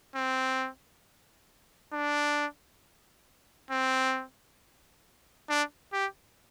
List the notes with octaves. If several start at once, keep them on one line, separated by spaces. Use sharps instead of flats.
C4
D4
C4
D4
G4